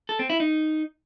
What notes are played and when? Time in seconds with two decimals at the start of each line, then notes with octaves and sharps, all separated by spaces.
0.09 A4
0.19 C4
0.30 E4
0.40 D#4